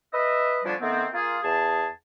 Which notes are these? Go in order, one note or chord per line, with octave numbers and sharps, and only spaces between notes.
B4 D#5 E5
D3 F3 G3 B3 C#4 D4
D#3 A3 B3 C4
A#3 F4 G#4
E2 G#4 A5